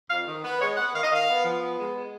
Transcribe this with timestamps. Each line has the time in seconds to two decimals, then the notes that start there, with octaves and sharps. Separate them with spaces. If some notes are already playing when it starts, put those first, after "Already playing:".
0.11 F2 F5
0.27 D#3
0.44 B3
0.61 G#3 C#5
0.77 B3 F#5
0.94 D#3 F5
1.03 D#5
1.11 D#3 F5
1.29 B3
1.44 F3
1.62 B3
1.79 G#3
1.96 G#3